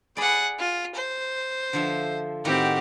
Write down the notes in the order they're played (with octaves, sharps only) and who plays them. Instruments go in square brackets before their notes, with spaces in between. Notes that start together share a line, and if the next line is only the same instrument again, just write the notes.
[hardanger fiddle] G#4 F#5 [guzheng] D5 B5
[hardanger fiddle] F4
C5
[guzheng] D3 F3 E5
[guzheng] A2 D#3 F#4 [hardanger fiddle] C4 G4